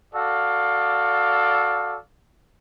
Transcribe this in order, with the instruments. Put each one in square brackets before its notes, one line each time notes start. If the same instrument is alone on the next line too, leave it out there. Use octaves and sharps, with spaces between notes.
[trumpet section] F#4 A4 D5 F5